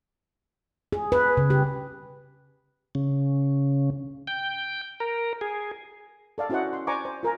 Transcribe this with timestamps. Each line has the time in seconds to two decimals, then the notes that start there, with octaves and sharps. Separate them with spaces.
0.93 G#4
1.12 B4
1.37 C#3
1.50 G4
2.95 C#3
4.27 G5
5.00 A#4
5.41 G#4
6.38 A4 D5 F5
6.50 C#4 E4 F#4 C5 D#5 F#5
6.73 C6
6.87 C5 D5 G#5 A#5 C#6 D6
7.05 C5
7.23 F4 A#4 G#5 A#5